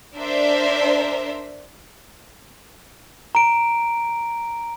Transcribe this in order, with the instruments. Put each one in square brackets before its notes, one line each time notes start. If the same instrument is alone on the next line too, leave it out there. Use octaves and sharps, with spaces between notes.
[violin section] D4 A#4 C5 E5
[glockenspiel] A#5 D7